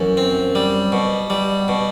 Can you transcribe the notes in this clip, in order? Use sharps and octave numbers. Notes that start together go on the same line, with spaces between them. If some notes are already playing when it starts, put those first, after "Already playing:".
Already playing: F#2 E3
C4
G3
B2
G3
B2